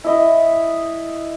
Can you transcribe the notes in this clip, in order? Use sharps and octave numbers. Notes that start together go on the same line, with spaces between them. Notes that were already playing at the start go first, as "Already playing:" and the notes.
E4 D#5 E5